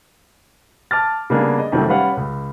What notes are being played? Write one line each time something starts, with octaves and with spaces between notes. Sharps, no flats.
A5 D6 F6 A6
C#3 G3 A#3 B3 D4 G#4
D#5
F2 C3 D#3 F#3 A3 C#4
G3 C#4 B4 C#5 F5 F#5
C#2